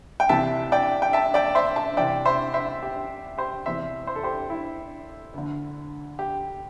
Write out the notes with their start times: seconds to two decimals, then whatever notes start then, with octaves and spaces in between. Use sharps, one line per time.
0.20 G5
0.29 C2 C3 E3 E5 A5
0.72 D5 G5
1.02 G5
1.13 E5 A5
1.34 D5 G5
1.55 C5 E5
1.76 E5 A5
1.97 C2 C3 E3 D5 G5
2.25 C5 E5
2.54 C5 E5
2.82 G4
3.38 G4 C5
3.66 E2 C3 E3 C5 E5
4.07 C5
4.16 A4
4.23 G4 C5
4.50 E4
5.34 D2 D3
6.19 G4